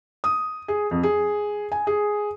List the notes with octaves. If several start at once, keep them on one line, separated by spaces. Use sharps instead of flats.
D#6
G#4
F2
G#4
G#5
G#4